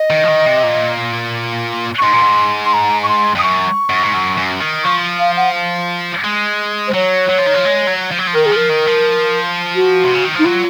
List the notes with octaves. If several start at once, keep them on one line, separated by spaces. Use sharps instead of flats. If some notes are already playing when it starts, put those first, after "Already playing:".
Already playing: D#5
D#3
F3
D#3
C3
A#2
C#6
G#2 C6
A#2
G#2
C6
A#5
C#6
C6
F2
D#6
F#2 C#6
F#2
G#2
F#2
F#2
D#3
F3 C#6
F5
F#5
G#3
C5
F#3 C#5
F#3
F3
D#3
F3
G#3
F#3
F3
F#3
F3
D#3 A#4
G#4
F3 A#4
D#3
F3
F#4
C3
C#3
D#3
F3 D#4
F#3 F4